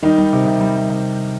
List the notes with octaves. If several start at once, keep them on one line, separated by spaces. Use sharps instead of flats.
D#3 G3 D#4
G3
C3
C3
G3
G3
C3